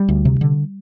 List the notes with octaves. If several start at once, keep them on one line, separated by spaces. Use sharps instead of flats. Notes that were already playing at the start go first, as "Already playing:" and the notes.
Already playing: G3
D2
C3
D3